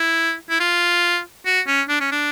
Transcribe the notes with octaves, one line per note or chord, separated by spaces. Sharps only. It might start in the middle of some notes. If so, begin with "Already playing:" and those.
Already playing: E4
E4
F4
F#4
C#4
D4
C#4
D4